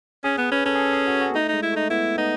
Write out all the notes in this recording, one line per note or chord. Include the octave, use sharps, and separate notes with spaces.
C#4 G#4
B3
C#4 B4
C#4 A4
G#4
A4
G#4
F#4
F#4
B3
A3 D#4
G#3 D#4
E4
A3 D#4
B3 E4
B3 D#4